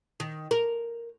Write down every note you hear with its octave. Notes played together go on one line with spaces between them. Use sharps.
D#3
A#4